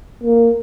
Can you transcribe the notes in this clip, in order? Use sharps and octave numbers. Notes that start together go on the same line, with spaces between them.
A#3